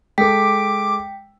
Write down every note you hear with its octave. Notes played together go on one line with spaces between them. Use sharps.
G#3 A4 G5 D6 B6